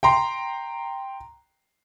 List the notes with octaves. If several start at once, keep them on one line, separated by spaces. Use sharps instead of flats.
G5 A#5 C6